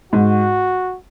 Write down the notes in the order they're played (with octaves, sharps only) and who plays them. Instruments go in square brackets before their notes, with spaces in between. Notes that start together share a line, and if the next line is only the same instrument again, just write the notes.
[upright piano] G#2 [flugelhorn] F#4